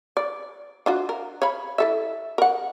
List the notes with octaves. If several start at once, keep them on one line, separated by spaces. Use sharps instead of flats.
D5
D4 F4 F#4
A#4
C#5 F5 B5
E4 A4 E5
A#4 F#5